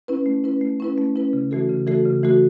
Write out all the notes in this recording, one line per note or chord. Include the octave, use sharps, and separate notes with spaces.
C#4 E4 B4
A3
C#4 E4 B4
A3
C#4 E4 B4
A3
C#4 E4 B4
C#3
E3 A3 F#4 A4
C#3
E3 A3 F#4 A4
C#3
E3 A3 F#4 A4